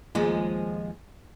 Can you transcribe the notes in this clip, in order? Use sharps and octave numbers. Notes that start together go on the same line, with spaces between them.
D#2 F3 G#3